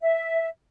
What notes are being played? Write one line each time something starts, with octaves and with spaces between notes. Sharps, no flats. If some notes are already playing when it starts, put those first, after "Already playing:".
E5